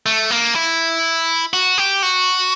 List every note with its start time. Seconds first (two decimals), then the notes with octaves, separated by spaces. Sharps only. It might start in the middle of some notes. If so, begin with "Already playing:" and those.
0.06 A3
0.30 A#3
0.55 E4
1.53 F#4
1.78 G4
2.03 F#4